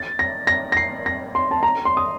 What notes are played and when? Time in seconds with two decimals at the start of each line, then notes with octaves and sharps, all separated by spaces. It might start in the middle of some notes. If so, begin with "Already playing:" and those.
Already playing: A6
0.19 A#6
0.47 A#6
0.72 A#6
0.77 C7
1.06 A#6
1.35 C6
1.51 A5
1.63 A#5
1.85 C6
1.97 D#6